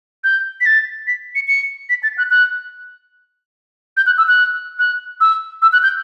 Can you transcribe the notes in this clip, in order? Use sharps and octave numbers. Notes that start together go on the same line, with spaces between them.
G6
B6
A6
B6
C#7
C#7
B6
A6
F#6
F#6
G6
F#6
E6
F#6
F#6
E6
E6
F#6
G6